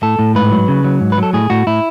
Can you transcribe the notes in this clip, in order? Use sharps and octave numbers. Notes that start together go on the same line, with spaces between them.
A2 A4
A2
G#2 B4
F#3
C#3
F#3
G#2
B4
F#3
A4
A2 G#4
A2 F#4
A2 E4